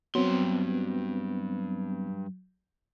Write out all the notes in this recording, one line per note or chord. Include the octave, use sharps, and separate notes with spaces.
G2 F#3 B3 C4 C6